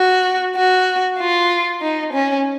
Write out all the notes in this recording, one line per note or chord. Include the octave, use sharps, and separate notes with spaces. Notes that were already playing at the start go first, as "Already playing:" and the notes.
Already playing: F#4
F#4
F4
D#4
C#4